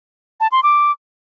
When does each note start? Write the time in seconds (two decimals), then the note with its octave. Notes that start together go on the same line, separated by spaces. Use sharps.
0.40 A5
0.52 C6
0.63 D6